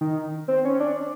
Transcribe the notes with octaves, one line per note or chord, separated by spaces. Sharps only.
D#3
C4
C#4
D4